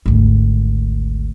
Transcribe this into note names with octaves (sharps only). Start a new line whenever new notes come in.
G#1 D2